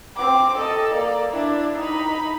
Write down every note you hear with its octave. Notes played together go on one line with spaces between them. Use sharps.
C4 D6
A4 D#5
A#3 D5
D4 E4
D#4 B5